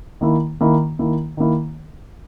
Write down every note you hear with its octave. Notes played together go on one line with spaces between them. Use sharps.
D#3 A#3 E4
D#3 A#3 E4
D#3 A#3 E4
D#3 A#3 E4